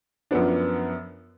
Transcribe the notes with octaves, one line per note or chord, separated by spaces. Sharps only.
F#2 F3 B3 D4